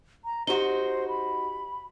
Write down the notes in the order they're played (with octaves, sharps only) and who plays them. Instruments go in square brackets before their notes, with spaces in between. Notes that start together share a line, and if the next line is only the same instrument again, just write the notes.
[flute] A#5
[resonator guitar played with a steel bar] D#4 F#4 [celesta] G4 G7 [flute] C5
[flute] B5